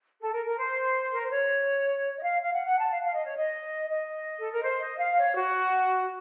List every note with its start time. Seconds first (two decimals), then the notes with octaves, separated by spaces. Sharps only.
0.21 A4
0.33 A#4
0.45 A#4
0.58 C5
1.13 A#4
1.23 C5
1.31 C#5
2.19 D#5
2.24 F5
2.42 F5
2.54 F#5
2.66 F#5
2.79 A5
2.90 F5
3.03 F5
3.14 D#5
3.26 C#5
3.37 D#5
3.89 D#5
4.40 A4
4.52 A#4
4.62 C5
4.81 D#5
4.99 F5
5.18 C#5
5.36 F#4